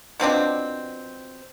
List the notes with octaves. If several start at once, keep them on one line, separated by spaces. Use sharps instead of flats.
B2 F3 C4 D4